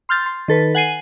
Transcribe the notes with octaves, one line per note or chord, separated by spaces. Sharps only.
C6 F6 G6 A6
C6
D#3 A4 B4
F#5 G#5 C7 D#7